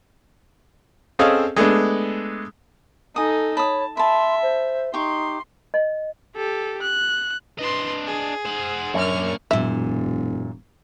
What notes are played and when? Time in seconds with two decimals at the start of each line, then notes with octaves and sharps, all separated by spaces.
1.19 C4 C#4 G#4 A4 D#5 F5
1.56 G#3 A3 B3 D4
3.16 D#4 A4 G#5 D#6
3.57 C#5 A5 B5 D#6
3.97 E5 A5 B5 C6
4.42 C5
4.94 D#4 G4 C6 C#6
5.74 D#5
6.36 G4 A4
6.82 F#6
7.58 D4 B4 D#5 C6
8.07 G#4
8.45 C5 F#5
8.94 F#2 A#3 D4 C#6 F6
9.51 E1 F#2 A#2 E5